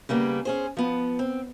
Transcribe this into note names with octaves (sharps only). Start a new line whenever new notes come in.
C#3 G3 A#3 B3
C#4 G#4 C5
F3 B3
C4